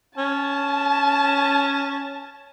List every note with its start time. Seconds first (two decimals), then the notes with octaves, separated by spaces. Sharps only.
0.18 C#4 A5